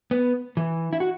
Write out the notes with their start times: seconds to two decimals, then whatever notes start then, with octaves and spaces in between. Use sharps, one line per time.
0.11 B3
0.57 E3
0.93 E4
1.00 F#4